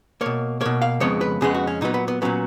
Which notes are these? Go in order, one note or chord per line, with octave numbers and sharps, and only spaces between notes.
B2 A#3 C#5
B2 A#3 C#5
F5
F2 C#3 G#3 B3 C#5
B4
F2 C#3 G#3 B3 G#4
F#4
C#4
A#2 F#3 B3 D#4
B3
B3
A#2 F#3 B3 C#4